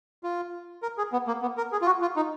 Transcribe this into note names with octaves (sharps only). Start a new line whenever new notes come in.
F4
A#4
G#4
B3
A#3
B3
A#4
G#4
F4
F#4
F4
D#4